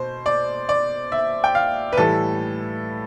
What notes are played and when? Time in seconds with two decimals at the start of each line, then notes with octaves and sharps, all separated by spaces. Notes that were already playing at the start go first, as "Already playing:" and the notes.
Already playing: B2 C5
0.26 D5
0.69 D5
1.12 E5
1.44 G5
1.55 F5
1.93 B4
1.97 A2 E3 G3 A4